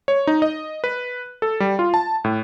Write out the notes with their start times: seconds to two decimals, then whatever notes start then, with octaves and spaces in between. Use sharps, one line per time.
0.08 C#5
0.27 D#4
0.42 D#5
0.84 B4
1.42 A4
1.60 G3
1.79 F4
1.94 A5
2.24 A2